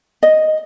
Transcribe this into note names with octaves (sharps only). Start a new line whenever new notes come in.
D#5